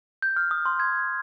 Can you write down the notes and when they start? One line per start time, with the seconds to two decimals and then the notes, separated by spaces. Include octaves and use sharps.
0.22 G6
0.37 F6
0.51 D#6
0.66 C6
0.80 G#6